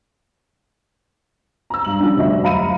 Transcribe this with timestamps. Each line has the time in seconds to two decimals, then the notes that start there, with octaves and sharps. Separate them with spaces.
1.70 A#5 E6
1.85 G2 F#7
2.00 F3 G3 C#4 D4
2.17 F1 D2 G3 D#5 E5
2.43 F#2 F5 A#5 B5 C#7 D#7